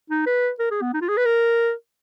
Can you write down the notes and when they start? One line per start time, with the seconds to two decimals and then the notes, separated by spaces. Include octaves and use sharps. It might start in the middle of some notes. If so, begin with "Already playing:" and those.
0.10 D#4
0.27 B4
0.59 A#4
0.71 G#4
0.82 B3
0.94 D#4
1.01 F4
1.09 G#4
1.17 B4
1.26 A#4